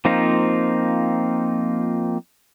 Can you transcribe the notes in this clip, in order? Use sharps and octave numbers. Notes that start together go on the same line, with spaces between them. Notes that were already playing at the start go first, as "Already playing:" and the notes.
F3 A#3 C4 D#4 F4